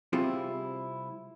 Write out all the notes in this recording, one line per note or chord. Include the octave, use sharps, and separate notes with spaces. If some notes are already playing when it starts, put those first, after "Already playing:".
C3 G3 C4 E4 F4 G#4